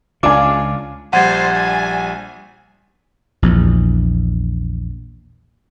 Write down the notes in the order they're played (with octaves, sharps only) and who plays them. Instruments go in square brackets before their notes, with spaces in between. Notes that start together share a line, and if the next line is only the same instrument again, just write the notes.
[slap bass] C#2 C#3 [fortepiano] D4 F4 [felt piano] F5 G#5 [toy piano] D6
[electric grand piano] A#1 G3 [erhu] C5 [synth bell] F#5 G#6 A6
[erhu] G#5
[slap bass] A#1 E2